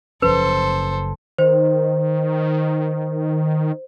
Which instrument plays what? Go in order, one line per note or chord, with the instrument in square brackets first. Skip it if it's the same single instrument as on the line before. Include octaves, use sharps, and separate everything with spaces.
[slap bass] F#1 F3 C#4 [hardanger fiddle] A4 C5 [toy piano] B4
[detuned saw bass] D#3 [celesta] C5